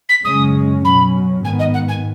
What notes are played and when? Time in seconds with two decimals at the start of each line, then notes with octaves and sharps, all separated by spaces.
0.09 B6
0.24 F#2 C#3 G#3 C#4 D#6
0.84 B2 F#3 C#4 B5
1.43 G#2 D#3 B3 G#5
1.59 D#5
1.74 F#5
1.88 G#5